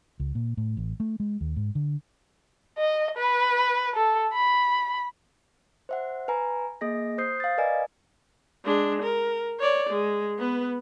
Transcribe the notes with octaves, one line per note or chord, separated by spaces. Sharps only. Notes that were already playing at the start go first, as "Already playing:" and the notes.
C#2
A#2
A2
A1
A3
G#3
D#2
G#2
D3
D#5
B4
A4
B5
C5 E5 F#5
B4 G#5 A#5
A#3 G#4 D#5 A#6
C5 D#6 G6 C7
F5 A6
A#4 B4 D5 D#5 G#5
G#3 D4
A#4
C#5 D5
G#3
B3 B4